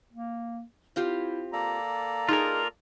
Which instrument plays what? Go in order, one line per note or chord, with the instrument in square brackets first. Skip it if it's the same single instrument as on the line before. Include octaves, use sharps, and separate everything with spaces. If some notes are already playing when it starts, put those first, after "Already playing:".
[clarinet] A#3
[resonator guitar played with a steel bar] C4 F4 G4 [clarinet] E4
[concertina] A#3 A4 D5 [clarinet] A#5
[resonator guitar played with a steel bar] D#4 G#4 [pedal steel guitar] F4 A#4